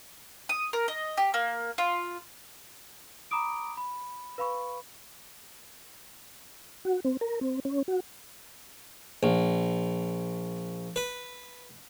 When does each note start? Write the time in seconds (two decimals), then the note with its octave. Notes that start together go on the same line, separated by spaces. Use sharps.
0.49 D#6
0.73 A#4
0.88 D#5
1.17 G4
1.34 A#3
1.78 F4
3.31 A#5 B5 D6 D#6 D7
3.77 B5
4.38 B4 F5 B5 C#6
6.85 F#4
7.05 C4
7.21 A#4
7.41 C4
7.65 C#4
7.88 F#4
9.23 A#1
10.96 B4